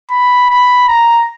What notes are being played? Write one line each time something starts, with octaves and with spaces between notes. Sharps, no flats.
B5
B5
A#5